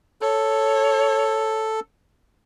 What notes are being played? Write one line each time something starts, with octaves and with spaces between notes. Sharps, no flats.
A4 C#5